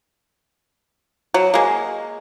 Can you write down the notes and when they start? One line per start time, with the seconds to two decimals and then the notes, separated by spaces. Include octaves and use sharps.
1.34 F#3
1.54 G#3 A#3